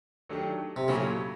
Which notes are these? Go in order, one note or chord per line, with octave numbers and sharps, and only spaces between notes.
D#3 F#3 A3 D4 G4
C3
A#2 C#3 F#3 A3 C#4 E4